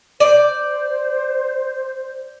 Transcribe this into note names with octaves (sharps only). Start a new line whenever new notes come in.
C5 D5